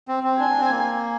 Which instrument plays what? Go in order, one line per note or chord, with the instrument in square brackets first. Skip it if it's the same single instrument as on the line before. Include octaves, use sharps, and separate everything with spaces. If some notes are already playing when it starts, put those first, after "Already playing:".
[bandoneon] C4
C4
[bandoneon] D4 [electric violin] G#5
[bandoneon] D4
C4
A#3